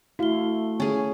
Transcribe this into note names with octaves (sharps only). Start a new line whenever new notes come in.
A3 E4 F#4 F5 G7
C#4 G#4